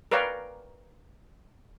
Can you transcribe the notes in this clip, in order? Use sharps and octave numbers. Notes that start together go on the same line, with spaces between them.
A#4 B4 C#5 D5 F5 G5